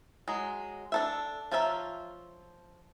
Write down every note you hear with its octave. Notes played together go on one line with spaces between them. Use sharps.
F#3 G#3
D4 A4 E5
F3 F4 C#5 E5 A#5